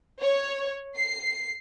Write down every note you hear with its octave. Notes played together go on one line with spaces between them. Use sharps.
C#5
C7